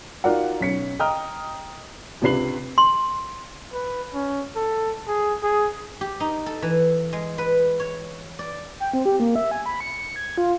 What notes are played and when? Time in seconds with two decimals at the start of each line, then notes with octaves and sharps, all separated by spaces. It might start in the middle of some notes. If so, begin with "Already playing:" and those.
0.24 D#4 F4 F#4 A#4 D5 F#5
0.61 B1 C#4 B6 C#7
0.99 D#5 G5 A#5 D#6 F6
2.21 C#2 C3 D4 B4 C7 F#7
2.78 C6
3.73 B4
4.14 C#4
4.56 A4
5.08 G#4
5.43 G#4
6.01 G4
6.20 D#4
6.46 A4
6.62 E3
7.13 G#3
7.38 B4
7.80 C#5
8.39 D5
8.80 G5
8.93 C4
9.05 G4
9.20 A#3
9.36 E5
9.51 G#5
9.66 B5
9.81 C#7
9.98 C#7
10.16 G#6
10.38 F4